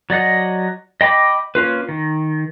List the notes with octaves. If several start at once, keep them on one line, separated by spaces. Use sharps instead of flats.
F#3 D5 D#5 F#5
D#5 G5 B5 D6
A#3 C#4 F4 B4
D#3